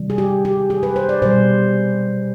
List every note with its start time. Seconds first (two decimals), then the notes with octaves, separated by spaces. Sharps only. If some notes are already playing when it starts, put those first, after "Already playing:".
Already playing: C3 D#3 G3
0.10 G#4
0.18 G4
0.45 G4
0.70 G#4
0.83 B4
0.96 C5
1.09 D5
1.22 B2 G3 C5